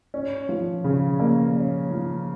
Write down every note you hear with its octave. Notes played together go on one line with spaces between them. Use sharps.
C#4
F3
C#3
A#3
C#4
F3